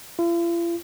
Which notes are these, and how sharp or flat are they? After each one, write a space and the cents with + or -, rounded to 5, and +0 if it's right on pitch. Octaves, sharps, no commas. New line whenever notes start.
F4 -45